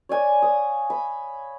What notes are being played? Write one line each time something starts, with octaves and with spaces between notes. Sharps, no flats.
C#5 D5 G#5 C#6
F5 D#6
B5